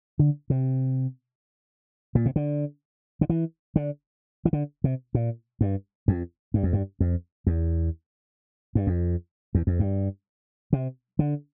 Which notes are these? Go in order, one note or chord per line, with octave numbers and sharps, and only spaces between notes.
D3
C3
A#2
C3
D3
D3
E3
D3
E3
D3
C3
A#2
G2
F2
G2
F2
G2
F2
E2
G2
F2
E2
F2
G2
C3
D3